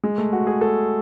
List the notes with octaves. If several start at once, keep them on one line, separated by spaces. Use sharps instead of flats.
G#3
A3
F#4
G#4
A4